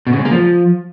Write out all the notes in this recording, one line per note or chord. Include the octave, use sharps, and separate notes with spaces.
B2
C#3
G#3
A#3
F3